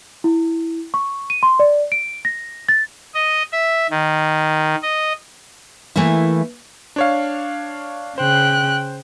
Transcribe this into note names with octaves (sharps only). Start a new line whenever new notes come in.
E4
C#6
D#7
C6
D5
D7
A#6
A6
D#5
E5
D#3
D#5
E3 A3 A#3 E4
D4 C#5 F5
C#3 C5 G5 F#6